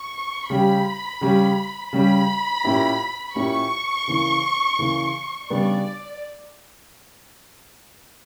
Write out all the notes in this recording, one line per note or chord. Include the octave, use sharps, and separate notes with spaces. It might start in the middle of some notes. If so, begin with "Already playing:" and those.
Already playing: C#6
C#3 G3 C#4 G4 B5
C#3 G3 C#4 G4
C#3 G3 C#4 G4 B5
A#2 A#3 C#4 E4 G4
A#2 A#3 C#4 E4 G4 C#6
C#3 E3 A#3
C#3 E3 A#3
C#3 G3 B3 D4 D5